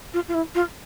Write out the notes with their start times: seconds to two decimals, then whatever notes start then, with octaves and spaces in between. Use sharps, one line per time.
0.13 F4
0.28 F4
0.34 E4
0.55 F4